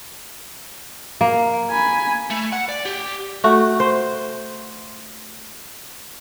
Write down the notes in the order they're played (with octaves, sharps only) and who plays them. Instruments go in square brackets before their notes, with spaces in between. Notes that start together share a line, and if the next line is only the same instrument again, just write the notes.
[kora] A#3
[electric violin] G#5 B5
[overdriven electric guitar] A3
F#5
D5
G4
[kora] A3 F#4
C5